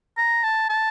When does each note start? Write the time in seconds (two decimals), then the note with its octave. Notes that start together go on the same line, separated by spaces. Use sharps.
0.17 A#5
0.43 A5
0.69 A5